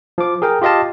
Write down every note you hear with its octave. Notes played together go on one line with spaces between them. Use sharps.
F3 D6
G#4 A#4 G5
F4 G4 D#5 F5 A5